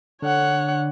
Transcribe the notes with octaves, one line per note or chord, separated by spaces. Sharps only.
D3 C#5 F#5